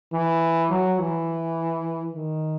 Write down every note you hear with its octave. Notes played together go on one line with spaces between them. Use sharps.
E3
F#3
E3
D#3